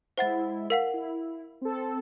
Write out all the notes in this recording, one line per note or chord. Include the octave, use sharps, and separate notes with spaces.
G#3 E4 C5 F#5 A6
A#4 F5 F#5
E4
C4 A4